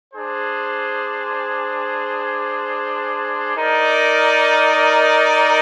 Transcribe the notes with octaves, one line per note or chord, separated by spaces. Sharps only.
D4 G#4 C5
D#4 A#4 D5